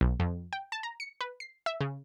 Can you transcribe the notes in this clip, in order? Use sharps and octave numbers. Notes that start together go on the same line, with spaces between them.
B1
F2
G5
A5
A#5
C#7
B4
C7
E5
C#3